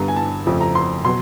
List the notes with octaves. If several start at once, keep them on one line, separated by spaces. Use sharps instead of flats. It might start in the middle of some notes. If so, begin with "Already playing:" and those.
Already playing: G2 D3 G3 B3 A#5
G#5
A5
F2 C#3 F3 A3
A#5
C6
B2 F#3 B3 C6